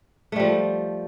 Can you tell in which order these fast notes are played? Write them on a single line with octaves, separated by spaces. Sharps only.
A3 G3 F3